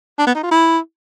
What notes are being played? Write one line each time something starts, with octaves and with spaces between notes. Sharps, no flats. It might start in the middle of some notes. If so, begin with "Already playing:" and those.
D4
B3
D#4
F4
E4